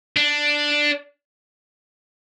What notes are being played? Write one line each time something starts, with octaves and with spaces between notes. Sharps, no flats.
D4